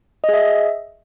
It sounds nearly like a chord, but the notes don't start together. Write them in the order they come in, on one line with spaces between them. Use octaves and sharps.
D#5 G#4 E5